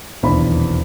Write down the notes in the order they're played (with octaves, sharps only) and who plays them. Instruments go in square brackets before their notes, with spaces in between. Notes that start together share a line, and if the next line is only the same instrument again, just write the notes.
[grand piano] D#1 B1 E2 D4 C5 B5